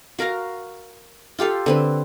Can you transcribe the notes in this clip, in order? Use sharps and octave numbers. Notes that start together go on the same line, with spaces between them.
F#4 A#4 F5 A#5
F4 G4 A4 F5
D3 C4 B4